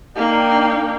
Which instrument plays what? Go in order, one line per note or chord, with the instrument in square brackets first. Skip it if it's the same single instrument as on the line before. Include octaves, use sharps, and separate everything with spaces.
[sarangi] A#3 [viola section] D4 D#4 G5